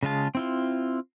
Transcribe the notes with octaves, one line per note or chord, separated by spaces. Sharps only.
C#3 G#3 F4 A5
C4 E4 F4